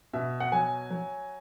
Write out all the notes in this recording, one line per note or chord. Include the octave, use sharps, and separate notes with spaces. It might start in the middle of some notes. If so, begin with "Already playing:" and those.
B2 E5
F#5
F#3 G#5
F#3